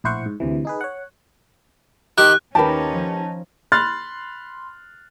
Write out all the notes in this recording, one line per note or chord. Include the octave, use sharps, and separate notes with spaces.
A#1 A2 E4 C5 F#5 C#6
G#2
D2 C3 E3
D#4 G#4 B4
C#5 F#5
D#3 G4 F#6
D#2 C#4 D#4 G4 A#4 B4 A5 E7
F3
B5 C6 F6 F#6 A6